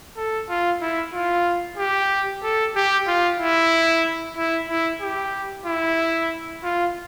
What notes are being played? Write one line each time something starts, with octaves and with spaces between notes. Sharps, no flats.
A4
F4
E4
F4
G4
A4
G4
F4
E4
E4
E4
G4
E4
F4